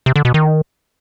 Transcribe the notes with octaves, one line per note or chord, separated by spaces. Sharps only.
C3
D3
B2
D#3